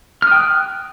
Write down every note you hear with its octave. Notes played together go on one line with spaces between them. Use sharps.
G5 D#6 F6 F#6